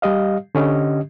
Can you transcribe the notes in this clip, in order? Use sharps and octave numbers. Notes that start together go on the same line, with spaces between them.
G3 G4 D#5 F5
D3 C#4 G4 D#5